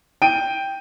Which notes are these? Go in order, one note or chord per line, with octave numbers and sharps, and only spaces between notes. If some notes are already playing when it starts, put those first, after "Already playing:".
G5 D7 D#7